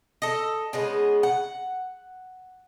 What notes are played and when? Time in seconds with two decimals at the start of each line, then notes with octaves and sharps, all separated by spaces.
0.22 A4 D#5
0.73 C#3 G#3 B3
1.23 F#5